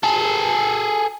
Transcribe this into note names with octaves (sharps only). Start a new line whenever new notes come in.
G#4 A4